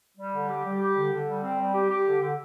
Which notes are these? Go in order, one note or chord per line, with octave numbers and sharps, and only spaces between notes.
G3
D3
G4
G3
G4
D3
D3
G3
C4
G3
G4
G4
D3
D3